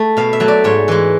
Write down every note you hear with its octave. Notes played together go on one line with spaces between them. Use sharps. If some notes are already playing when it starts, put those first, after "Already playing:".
Already playing: A3
B2 F5
E5
F#3 A3
D5
G#2 C#5
E3 G#3